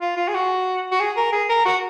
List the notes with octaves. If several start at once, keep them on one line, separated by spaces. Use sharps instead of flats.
F4
F4
G#4
F#4
F#4
G#4
A#4
G#4
A#4
F#4